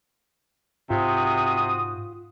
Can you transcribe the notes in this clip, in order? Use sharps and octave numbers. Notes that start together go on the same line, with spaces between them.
G#2 C3 F4 F#4 C5 D#6